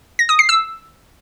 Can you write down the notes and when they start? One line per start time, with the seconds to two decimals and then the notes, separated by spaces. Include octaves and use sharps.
0.19 A#6
0.29 D#6
0.39 C7
0.49 E6